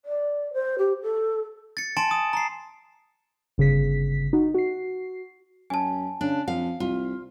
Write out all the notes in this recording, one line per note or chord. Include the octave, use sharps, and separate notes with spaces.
D5
C5
G4
A4
A6 C#7
G#5 A5 C6 A6 D7 E7
D#6
A#5 C7
G1 C#3 G#4 B6
D#4 F#4
F#4 C7
F#2 G#5 A5
C#3 D4
F2 F5
C2 F4